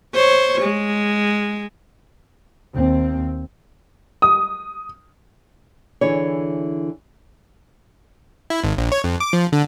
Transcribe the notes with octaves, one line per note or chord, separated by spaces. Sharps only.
C5 C#5
G#3
D#2 C4
D#6
D3 E3 E4 G#4 C#5
E4
G#1
A#1
C#5
F2
D6
F3
D3